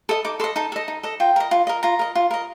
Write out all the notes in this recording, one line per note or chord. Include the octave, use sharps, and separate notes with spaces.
A4 D#5 D#6
D#4 D6
A4 D#5 C6
D#4 A5
A4 D#5
D#4
A4 D#5
F4 G5
A#4 D#5
F4
A#4 D#5
F4 A#5
A#4 D#5
F4
A#4 D#5